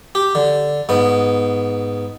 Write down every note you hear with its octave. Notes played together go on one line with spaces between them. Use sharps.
G4
D3
G#2 B3